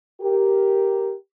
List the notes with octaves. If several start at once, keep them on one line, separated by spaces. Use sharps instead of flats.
G4 A#4